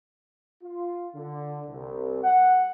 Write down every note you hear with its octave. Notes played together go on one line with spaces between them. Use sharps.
F4
D3
C2
F#5